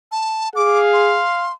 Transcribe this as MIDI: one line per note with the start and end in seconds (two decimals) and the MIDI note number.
0.12 0.49 81
0.56 1.22 68
0.56 1.50 77
0.56 0.79 86
0.93 1.53 84